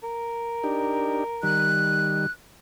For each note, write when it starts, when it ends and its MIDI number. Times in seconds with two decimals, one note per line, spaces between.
0.03 1.79 70
0.63 1.24 62
0.63 1.24 63
0.63 1.24 67
1.43 2.26 51
1.43 2.26 55
1.43 2.31 90